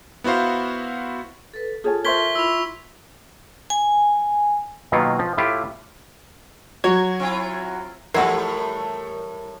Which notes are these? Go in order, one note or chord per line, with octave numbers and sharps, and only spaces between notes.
B3 E4 F#4 C5 F5
A4 B4
F4 G#4 A4 C#5 G#5 A5
A#4 C5 E5 C6 C#6 G#6 B6 G7
E4 F4 B5 E6 F7
G#5
B2 D#3 F#3 A#3 B3 F4
F3
A2 E4 F4 G4
F#3 F#4 C#5 G#6
C4 E4 F4
A2 E3 G3 A3 E4 F#4 A#4 C7